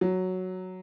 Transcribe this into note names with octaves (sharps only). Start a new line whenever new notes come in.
F#3